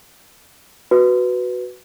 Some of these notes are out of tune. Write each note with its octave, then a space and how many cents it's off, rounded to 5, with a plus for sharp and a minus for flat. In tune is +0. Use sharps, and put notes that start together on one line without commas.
F#4 +0 B4 +0